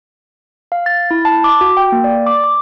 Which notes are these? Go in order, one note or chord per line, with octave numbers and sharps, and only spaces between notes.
F5
A6
E4
A5
D6
F#4
G5
A#3
D5
D6
D6